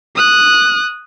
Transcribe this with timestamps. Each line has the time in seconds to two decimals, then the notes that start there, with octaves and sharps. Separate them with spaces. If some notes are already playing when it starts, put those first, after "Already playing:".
0.16 D#6 F#6